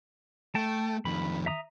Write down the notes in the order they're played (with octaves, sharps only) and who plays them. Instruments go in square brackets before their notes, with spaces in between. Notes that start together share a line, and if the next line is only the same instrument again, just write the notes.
[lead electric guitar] A3 [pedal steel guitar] G5 A5
[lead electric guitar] F2 D#3 [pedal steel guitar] B5
[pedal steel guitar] E5 A#5 D#6